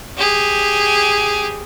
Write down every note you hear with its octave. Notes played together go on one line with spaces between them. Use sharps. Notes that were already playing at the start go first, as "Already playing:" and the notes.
G4 G#4